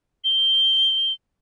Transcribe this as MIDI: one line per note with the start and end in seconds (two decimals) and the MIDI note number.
0.24 1.13 103